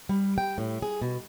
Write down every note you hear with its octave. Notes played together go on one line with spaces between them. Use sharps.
G3
G5
A2
G#4
B2